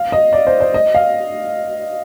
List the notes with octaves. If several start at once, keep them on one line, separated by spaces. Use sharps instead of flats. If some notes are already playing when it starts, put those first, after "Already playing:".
Already playing: F5
D#5
D5
C5
C5
D#5
F5